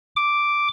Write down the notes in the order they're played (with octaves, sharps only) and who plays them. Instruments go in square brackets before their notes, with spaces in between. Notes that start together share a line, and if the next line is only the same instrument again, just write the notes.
[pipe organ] D6